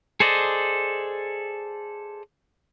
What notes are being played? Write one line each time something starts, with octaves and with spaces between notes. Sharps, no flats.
G#4 A4 C5 D5 D#5